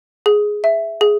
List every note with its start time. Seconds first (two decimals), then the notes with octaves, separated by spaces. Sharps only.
0.26 G#4
0.64 E5
1.01 G#4